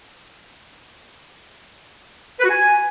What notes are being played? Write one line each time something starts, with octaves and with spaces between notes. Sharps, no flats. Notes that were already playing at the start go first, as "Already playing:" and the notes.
B4
F#4
G#5